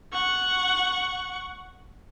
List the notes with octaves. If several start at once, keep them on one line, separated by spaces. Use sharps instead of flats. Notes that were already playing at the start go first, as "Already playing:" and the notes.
F#5 C#6